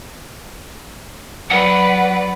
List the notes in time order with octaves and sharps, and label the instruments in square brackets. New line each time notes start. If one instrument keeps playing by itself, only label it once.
[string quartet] F#3 B4 D5 [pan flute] F#5